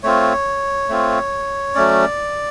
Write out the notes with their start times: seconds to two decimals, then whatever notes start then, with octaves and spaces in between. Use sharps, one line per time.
0.03 A3 C4 F4 C#5
0.89 A3 C4 F4
1.75 F#3 A3 C#4 D5